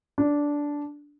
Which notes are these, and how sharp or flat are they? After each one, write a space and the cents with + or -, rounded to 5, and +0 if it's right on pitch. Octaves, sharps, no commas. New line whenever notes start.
D4 -10